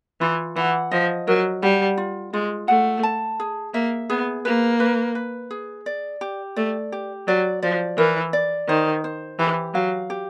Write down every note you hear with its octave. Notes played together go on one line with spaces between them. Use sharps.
E3 F4
E3 F#5
F3 D#5
F#3 A#4
G3 F#5
F4
G#3 F4
A3 F#5
A5
G#4
A#3 E5
B3 G#4
A#3 B4
B4
B4
G#4
D5
G4
A3 D5
G4
F#3 D5
F3 D5
E3 A#4
D5
D#3 C5
C5
E3 G4
F#3 F5
G4